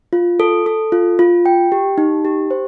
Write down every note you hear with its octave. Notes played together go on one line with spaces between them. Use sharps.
F4
A4
A4
F4
F4
G5
G4
D#4
G4
C5